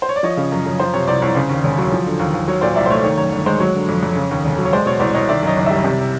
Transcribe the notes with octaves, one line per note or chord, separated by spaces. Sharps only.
C5
C#5
D5
F3 C#5 D#5
C#3
F#2
F#2
F3 C5
C3 C#5
C2 C5 D5
C2 C#5
C#3 C5
D#2
E1
F#3
F3
D3
D#2
D#2
F#3 C#5
A#2 C5 D5
C2 D5 E5
C5
A3 C#5
D#3 C#5
F#2 C#5
G1
G#3 C5
F#3 C#5
D3
F2
F2
C#3
D#2
E1
F#3
C#5
G#3 C5 D5
B2 C#5
C2 C5 D5
C2 C#5 D#5
D#3 D5 E5
F#2 C#5 D#5
F#1
G3 D5 E5
C3